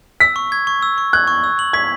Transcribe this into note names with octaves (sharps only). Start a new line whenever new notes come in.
E6 B6
C#6
G#6
C#6
E6
C#6
F#6 G#6
C#6
E6
F#7
G#6 B6